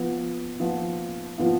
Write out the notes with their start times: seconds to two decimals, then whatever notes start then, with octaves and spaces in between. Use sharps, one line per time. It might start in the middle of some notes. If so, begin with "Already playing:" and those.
Already playing: F3 B3 F4
0.60 F3 B3 F4
1.38 F3 B3 F4